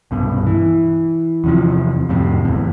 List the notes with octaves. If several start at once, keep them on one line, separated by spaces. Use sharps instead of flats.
C2 G2 B2
E3
E2 C3 F3
F2 A2 C3
F#1 E2